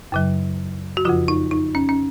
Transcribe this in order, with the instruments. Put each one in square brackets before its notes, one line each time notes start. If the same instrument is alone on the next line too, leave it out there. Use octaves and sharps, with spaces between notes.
[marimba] F#2 C#3 F#3
F#4
F2 C#3 F3 F4
D#4
D#4
C#4
C#4